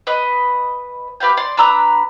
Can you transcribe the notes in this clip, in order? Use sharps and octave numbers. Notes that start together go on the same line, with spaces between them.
B4 D#5
G4 B4 F5 G5
D5 C6
D4 B4 A#5 E6